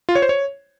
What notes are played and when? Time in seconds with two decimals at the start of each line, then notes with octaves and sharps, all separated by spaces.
0.09 F4
0.15 C#5
0.22 C5
0.29 C#5